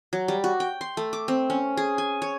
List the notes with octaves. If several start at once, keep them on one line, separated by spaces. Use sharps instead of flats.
F#3
G3
F#4
G5
C6
A3
D6
C4
C#4
G#4
G#5
C#5